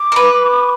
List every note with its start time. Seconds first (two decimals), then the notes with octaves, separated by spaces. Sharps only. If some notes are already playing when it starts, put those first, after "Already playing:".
Already playing: D6
0.12 A#4
0.16 B4